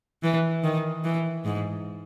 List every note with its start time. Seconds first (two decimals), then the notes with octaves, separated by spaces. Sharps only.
0.23 E3
0.64 D#3
1.04 E3
1.45 G#2